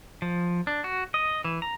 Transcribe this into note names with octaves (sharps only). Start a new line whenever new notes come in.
F3
D4
F#4
D#5
E3
A#5